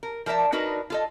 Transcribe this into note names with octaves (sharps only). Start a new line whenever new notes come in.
A#4
F3 A#4 D5 E5 A5
D4 D#4 F#4 A#4 B4
F4 A4 D#5